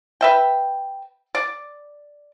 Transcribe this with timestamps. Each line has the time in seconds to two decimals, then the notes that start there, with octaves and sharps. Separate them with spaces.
0.21 B4 E5 G5
1.35 D5